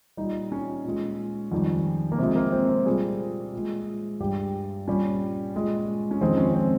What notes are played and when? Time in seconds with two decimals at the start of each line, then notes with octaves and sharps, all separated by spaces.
0.17 A#2 G3 D#4
0.52 C#4
0.85 A#2 G#3
1.52 F2 D#3 G3
2.12 A#3
2.18 C3 F3 G#3 C4
2.36 A#3
2.52 C4
2.69 C4
2.85 A#2 G3 G#4
3.53 A#2 G#3
4.20 G2 G3 G4
4.88 A#2 G3 C#4
5.54 A#2 G#3
6.11 C#4
6.21 F2 D#3 G#3 C4
6.38 C#4
6.55 C4